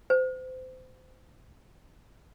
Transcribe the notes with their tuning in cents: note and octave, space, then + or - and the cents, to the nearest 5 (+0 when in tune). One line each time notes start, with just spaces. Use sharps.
C5 -30